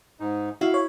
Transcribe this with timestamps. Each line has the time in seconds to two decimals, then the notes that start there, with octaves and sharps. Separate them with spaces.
0.20 G#2 D#4
0.61 E4 F#4 F5
0.74 C#5